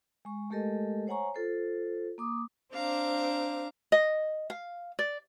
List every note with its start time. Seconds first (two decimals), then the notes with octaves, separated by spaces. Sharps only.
0.25 G#3 C#6
0.50 G#3 A3 G4 A4 A#4 D#5
1.07 C5 C#5 F#5 G#5 A#5 C#6
1.34 F4 A4 C5
2.18 A#3 D6 D#6
2.75 C4 D4 F5 A#5 D6
3.92 D#5
4.50 F5
4.99 D5